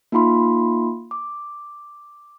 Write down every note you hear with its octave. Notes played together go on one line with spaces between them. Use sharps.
A#3 D#4 F4 B5 C6
D6